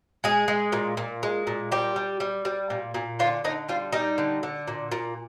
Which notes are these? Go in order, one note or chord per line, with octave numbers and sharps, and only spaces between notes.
G#3 G#4
G#3
A#2
A#2
G#3
A#2
G3 G4
G3
G3
G3
A#2
A#2
D3 F4
D3 D#4
G3 F4
G3 D#4
D3
D3
A#2
A#2